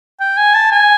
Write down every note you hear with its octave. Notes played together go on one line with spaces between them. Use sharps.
G5
G#5
A5
G#5